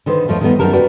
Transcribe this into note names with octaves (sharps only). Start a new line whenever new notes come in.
D3 D#3 B4 C5
F2 F3 A3 C#5 D#5
D#3 G3 A3 B3 D#4
F#2 D#3 G4 A#4 A5
F#4 B4 D5 G5